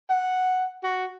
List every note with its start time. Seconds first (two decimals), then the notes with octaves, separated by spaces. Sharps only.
0.10 F#5
0.84 F#4